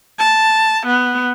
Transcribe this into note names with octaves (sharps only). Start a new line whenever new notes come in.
A5
B3